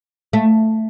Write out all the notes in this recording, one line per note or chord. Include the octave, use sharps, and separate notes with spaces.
A3